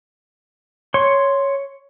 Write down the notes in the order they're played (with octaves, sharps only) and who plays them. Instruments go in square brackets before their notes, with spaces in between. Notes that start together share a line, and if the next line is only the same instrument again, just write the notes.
[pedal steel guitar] C#5 C6